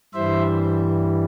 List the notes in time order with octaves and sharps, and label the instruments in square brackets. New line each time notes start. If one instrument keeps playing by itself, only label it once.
[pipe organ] G2 E3 G3 C5 E5